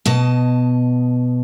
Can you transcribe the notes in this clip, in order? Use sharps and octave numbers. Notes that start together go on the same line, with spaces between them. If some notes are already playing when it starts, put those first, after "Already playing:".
B2 D#5 A5